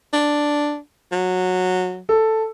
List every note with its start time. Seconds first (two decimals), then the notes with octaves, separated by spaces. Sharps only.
0.13 D4
1.12 F#3
2.09 A4